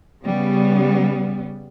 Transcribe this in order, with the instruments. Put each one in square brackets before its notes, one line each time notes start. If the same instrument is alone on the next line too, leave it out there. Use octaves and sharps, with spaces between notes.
[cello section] C#3 G3 B3